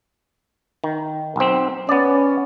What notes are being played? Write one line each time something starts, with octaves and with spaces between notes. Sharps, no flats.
D#3
B1 C4
B3 C#4 D5